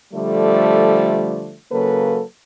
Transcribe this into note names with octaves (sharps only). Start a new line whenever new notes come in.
D3 F3 G3 A3
C#3 F#3 A#3 A4 B4